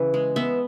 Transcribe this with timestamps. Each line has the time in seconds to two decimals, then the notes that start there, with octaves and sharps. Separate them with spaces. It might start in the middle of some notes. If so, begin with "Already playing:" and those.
Already playing: C#3 E3
0.14 G#3
0.36 B3 E5